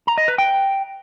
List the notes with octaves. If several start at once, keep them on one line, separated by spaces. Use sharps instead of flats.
A#5
D#5
B4
G5